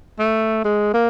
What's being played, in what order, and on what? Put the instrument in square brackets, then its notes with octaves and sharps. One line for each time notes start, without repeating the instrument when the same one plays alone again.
[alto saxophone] A3
G#3
A#3